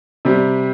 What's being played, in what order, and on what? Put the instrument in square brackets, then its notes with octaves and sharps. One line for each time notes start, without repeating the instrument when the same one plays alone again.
[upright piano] C3 G3